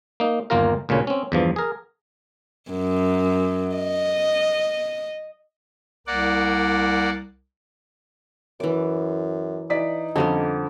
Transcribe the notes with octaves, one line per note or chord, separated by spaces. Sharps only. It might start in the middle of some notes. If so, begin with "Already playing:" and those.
A#3 D#4
G1 D#2 A#3 F4 A#4
D2 A#2 C#3 C#4
C4 C#4
E2 G2 F3
G#4 A#4
F#2
D#5
C2 A#3 D5 F#5
F#2 E3 D6
E3 D#4 D5 B6
F2 D3 G3 C#4